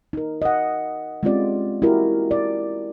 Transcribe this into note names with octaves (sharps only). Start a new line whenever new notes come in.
D#4 A#4
D#5 F#5
G#3 C4 C#4 F4 G4 D5
E4 F#4 G4 A#4
D5